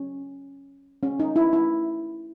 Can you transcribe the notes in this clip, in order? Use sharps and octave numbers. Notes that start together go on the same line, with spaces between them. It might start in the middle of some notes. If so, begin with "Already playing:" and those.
Already playing: C#4
C#4
D#4
E4
E4